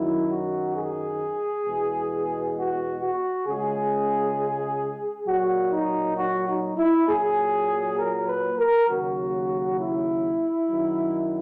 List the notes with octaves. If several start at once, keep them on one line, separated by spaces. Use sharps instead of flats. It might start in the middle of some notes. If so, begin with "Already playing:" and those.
Already playing: F#2 D#3 F#3 E4
F#4
G#4
E2 B2 G#3
F#4
F#4
C#2 C#3 G#3 G#4
A#2 F#3 F#4
D#4
F#4
D#4
E4
A#2 F#3 G#4
A#4
B4
A#4
D#2 C#3 F#3 F#4
E4
F#2 D#3 F#3